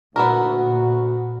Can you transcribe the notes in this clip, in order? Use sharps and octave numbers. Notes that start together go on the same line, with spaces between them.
D2 A#2 B3 E4 F#4 A#4